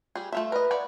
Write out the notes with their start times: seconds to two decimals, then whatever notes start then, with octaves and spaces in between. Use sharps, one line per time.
0.15 G3 G#4
0.32 A3 F4 E5
0.52 A#4 B4 D#5
0.71 C#5 D5 F#5